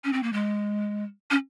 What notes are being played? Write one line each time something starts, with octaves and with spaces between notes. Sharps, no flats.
C#4
C4
A#3
G#3
C#4